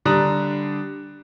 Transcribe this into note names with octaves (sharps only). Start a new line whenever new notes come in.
D3 G3 D4 A#5 D#6 F#6